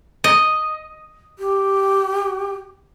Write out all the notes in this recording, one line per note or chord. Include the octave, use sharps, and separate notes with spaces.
D#5
G4